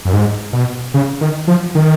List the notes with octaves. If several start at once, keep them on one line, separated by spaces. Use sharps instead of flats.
F#2
G#2
B2
C#3
D#3
F3
D#3